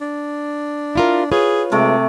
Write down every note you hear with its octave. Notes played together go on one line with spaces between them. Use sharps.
D4
E4 F4 A#4
F4 G#4 B4 C#5
C3 G#3 A3 D6